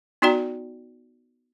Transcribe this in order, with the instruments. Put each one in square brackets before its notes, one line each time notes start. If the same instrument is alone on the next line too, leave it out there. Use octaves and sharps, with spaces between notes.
[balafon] B3 D#4 F#4 D5 G5 A#5